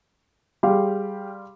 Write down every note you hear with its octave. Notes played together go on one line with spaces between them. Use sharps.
G3 G4 G#4 F5 C6